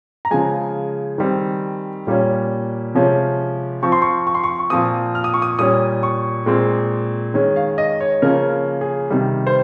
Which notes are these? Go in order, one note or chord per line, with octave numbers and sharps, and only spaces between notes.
A#5
C#3 F3 G#3 G#5
D#3 G3 C4
A#2 G3 A#3 C#4
C3 F3 G#3 C#4
F3 C4 C#6
C6
C#6
C#6
C6
C#6
C#6
A#2 F3 C4 D#6
F6
D#6
C#6
D#6
A#2 G3 C#4 D#6
C#6
A#2 G#3 C4
D#3 G#3 C#4
F5
D#5
C#5
C#3 F3 A#3 C#4 A#4
G#4
C3 D#3 G3
C5